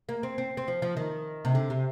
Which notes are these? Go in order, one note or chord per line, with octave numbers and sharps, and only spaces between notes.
A#3
C4
C4
C4
F3
F3
D#3
C3
D3
C3